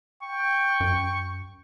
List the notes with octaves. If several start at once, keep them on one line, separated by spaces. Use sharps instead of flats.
G5 C#6
F#2